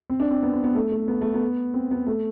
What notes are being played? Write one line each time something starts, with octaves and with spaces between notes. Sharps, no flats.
C4
D4
C4
B3
C4
B3
A3
A3
B3
A3
B3
C4
B3
A3